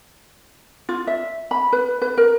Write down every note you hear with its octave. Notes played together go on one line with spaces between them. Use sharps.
F4
E5
B5
B4
B4
A#4